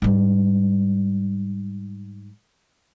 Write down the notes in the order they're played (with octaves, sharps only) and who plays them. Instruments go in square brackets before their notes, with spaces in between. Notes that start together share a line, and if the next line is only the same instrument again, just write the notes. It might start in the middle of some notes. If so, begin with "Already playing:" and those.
[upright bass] G#2 G3